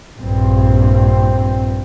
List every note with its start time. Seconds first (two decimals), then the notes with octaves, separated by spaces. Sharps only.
0.19 A#1 G2 C4